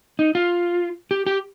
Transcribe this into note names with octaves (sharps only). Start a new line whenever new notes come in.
D#4
F4
G4
G4